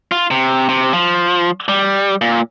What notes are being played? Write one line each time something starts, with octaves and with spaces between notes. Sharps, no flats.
F4
C3
C3
F3
G3
A#2